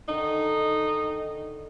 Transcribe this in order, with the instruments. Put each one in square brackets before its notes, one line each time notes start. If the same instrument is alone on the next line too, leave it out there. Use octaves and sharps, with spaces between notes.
[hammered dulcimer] D3 D#3 [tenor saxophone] D#4